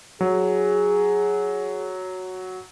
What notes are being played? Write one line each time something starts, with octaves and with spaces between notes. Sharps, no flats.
F#3 G#4